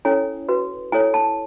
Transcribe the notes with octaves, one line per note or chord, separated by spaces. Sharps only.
C#4 E4 A4 C#5 G#5
F#4 B4
E4 A4 C#5 G#5
A5